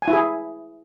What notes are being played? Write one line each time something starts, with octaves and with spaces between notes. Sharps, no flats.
G#5
E4
G#4